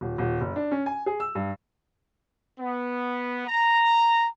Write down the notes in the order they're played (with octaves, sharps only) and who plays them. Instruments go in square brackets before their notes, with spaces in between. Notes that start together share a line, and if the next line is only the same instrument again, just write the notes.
[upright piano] D#1
D#1
F#1
D4
C#4
G#5
G#4
E6
G2
[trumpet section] B3
A#5